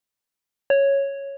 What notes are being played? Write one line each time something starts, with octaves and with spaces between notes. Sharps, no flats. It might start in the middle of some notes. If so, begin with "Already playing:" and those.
C#5